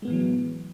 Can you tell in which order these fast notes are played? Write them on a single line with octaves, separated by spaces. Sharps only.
G#3 B3 A2 E3 F#3